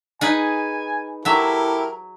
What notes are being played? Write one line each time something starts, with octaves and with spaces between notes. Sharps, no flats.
D#4 G#4 B4 G#5
F#3 E4 G4 A4 A#4 E5